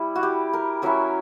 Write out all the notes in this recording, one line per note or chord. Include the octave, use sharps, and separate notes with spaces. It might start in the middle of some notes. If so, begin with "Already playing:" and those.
Already playing: G3 E4
F#4
G4
A#4
F#3 C#4 E4 A#4